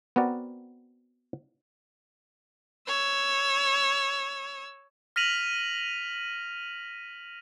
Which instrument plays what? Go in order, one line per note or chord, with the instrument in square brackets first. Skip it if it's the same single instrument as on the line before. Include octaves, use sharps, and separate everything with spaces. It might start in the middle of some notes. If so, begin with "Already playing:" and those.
[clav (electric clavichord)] B3 C4 F#4 A#4 D5
[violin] C#5 E6
[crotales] F6 A#6 B6 D#7 F7 F#7